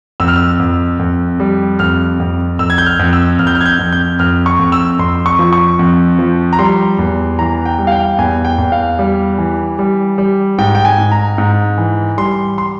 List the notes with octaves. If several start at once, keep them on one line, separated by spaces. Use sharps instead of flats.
F2 E6
F6
E6
F2
F2
G3
F2 F6
F2
F2 E6
G#6
G6
F6
F2
E6
F2 F6
G6
F6
G#6
G6
F2
G6
F2 F6
C#6
F2
E6
F2 C6
C#6
F3
C#6
F2
F3
A#5
G3 C6
E2
E3 A#5
G5
G3
F5
G5
E2 G#5
G5
E2
F5
G3
E3
G3
G3
G#2 G5
G5
G#5
G#2
A#5
G#2
E3
G3 C6
C6